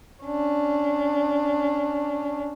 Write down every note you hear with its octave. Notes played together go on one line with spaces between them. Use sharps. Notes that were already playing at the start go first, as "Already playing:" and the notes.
C#4 D4